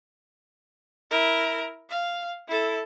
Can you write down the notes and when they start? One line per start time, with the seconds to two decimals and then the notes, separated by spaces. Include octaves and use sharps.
1.11 E4 A#4
1.90 F5
2.48 E4 A4